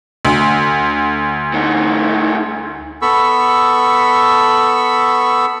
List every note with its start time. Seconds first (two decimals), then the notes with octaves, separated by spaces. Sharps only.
0.25 D2
1.53 A2 D#4
3.02 B3 A4 B5 C#6 E6